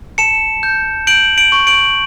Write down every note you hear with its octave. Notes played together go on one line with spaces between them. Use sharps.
A5 C#7 E7
G6
G6 D7 F#7
D7 F#7
C#6
D7 F#7